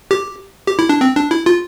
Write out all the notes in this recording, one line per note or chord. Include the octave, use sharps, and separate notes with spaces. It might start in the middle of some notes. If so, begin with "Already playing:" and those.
G4
G4
E4
D4
C4
D4
E4
F4